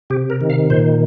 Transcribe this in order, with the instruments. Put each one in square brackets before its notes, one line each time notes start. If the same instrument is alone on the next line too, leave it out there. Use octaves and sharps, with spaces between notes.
[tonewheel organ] C3 G4
A#4
D#3
F5
A#2 C5